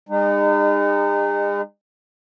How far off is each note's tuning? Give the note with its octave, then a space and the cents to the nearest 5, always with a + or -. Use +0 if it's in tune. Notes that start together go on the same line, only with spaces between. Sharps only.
G#3 -45 D#4 -30